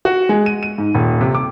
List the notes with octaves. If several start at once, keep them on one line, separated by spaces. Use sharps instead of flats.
F#4
G#3
D#7
D#7
G#2
D#1
C3
D6